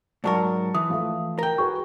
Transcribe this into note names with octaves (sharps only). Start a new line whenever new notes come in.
G#2 F#3 A#4 D5 A5 C#6
E3 D#6
F3 A3 E5
A#4 G5
F#4 G#4 B4 C#6